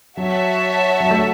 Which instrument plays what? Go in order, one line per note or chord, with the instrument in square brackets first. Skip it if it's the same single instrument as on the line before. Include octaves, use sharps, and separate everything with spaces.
[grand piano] F#3 [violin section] F#4 C#5 E5 A5
[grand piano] F#3
A3